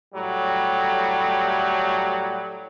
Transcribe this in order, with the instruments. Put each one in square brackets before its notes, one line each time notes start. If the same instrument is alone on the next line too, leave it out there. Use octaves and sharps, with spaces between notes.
[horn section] A2 F#3 G3